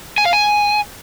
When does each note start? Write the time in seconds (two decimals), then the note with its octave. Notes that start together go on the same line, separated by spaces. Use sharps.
0.18 G#5
0.25 F5
0.33 G#5